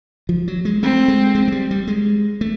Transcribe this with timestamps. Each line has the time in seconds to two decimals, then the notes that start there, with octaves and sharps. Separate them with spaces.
0.29 F3
0.48 F#3
0.65 G#3
0.83 A3 C4
1.08 G#3
1.35 G#3
1.48 G#3
1.52 G3
1.71 G3
1.88 G#3
2.41 A3